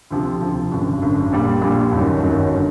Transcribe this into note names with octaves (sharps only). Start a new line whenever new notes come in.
D2 C3 F3
D2 C3 F3
G#1 F#2 D3
G#1 F#2 D3
A#1 A#2 G3
A#1 A#2 G3
G1 F#2 D#3 F#3
G1 F#2 D#3 F#3
D3